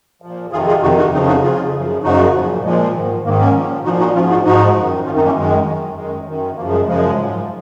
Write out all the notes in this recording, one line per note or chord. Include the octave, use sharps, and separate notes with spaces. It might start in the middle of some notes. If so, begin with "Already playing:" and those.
A#2 F3
F2 C3 D#3 F4 G#4
F4 G#4
F2 C3 D#3 D#4 F#4
D#4 F#4
F2 C#3 F3 C4 D#4
D#4 F#4
F2 C#3 F3 F4 G#4
F#2 C#3 F3
F#2 C#3 F3 D#4 F#4
A#2 F3
A#2 F3 G#3
G#2 D#3
G#2 D#3 A#3
A#3 C#4
A#2 F3
A#2 F3 D#4 F#4
D#4 F#4
G#2 F3 C#4 F4
D#4 F#4
G#2 F3 D#4 F#4
F#2 D#3
F#2 D#3 C#4 F4
C4 D#4
A#3 C#4
F#2 D#3 G#3
F#2 D#3
F#2 D#3 G#3
F#2 D#3
F#2 C#3 F3 A#3
G#3
F#2 C#3 F3 G#3
G#2 F3